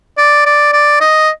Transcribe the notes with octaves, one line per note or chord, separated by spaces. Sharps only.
D5
D5
D5
D#5